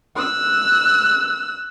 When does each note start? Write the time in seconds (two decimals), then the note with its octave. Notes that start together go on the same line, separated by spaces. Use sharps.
0.17 E6 F#6